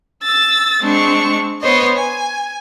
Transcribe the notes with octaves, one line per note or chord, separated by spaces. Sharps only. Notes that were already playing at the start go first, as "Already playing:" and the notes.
E6 A6
G#3 C4 D4 C#6
B3 C5 C#5 D#5
G#5